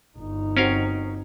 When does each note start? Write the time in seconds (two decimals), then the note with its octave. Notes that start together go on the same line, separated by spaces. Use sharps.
0.18 G1 D#4
0.57 C4 C#4 F#4 A#4 F5